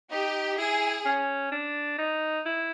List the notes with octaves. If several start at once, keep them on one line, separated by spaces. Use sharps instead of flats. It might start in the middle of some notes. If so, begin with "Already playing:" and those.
D#4 G4
E4 G#4
C#4
D4
D#4
E4